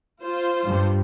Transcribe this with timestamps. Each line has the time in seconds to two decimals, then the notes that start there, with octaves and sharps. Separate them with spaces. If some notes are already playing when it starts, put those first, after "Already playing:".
0.22 F4 C5
0.67 G2